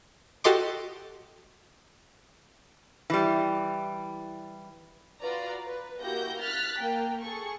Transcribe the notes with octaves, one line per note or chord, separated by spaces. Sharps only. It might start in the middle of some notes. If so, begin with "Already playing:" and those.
F#4 G4 A4 D#5 C6 D6
E3 G3
F4 F#4 B4 D5 A#5
B4
A#3 E4 F#4 G4 G6 A#6
F6 F#6 A6 B6
A#3 G5
G#4 A4 C#6